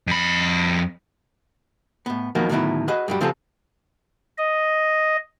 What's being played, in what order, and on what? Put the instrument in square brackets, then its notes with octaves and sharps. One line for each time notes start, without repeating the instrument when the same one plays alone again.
[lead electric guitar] F2 B5
[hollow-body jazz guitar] A2 B3
F2 D#3 F3 F#3 A#3 B3
A2 D3 D#3 F#3 B3 E4
F#4 G#4 B4 D#5
G2 F#3 G3
C#3 F3 C4 F4 G4 A4
[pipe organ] D#5